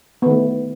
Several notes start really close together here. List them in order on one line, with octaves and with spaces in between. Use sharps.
B3 D#3 A3